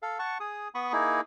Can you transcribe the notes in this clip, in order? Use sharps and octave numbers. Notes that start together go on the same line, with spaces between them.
A4 F5
F#5 A5 C#6
G#4 D#6
B3 B5 C#6 D#6
A#3 D#4 E4 G#4